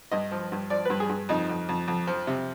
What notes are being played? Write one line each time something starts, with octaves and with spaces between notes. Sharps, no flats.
G2 D#5
F3
G2
F3 D5
G2 B4
G#4
G2
F2 D#4
F2
F2
F2
F3
C3